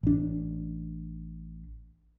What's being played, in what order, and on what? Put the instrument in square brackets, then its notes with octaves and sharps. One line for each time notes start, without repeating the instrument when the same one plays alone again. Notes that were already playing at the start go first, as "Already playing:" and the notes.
[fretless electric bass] A1 D4